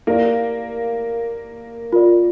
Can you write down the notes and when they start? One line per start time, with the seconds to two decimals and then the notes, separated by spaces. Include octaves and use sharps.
0.07 A#3 E4 G4 D5
1.93 F4 A#4 D5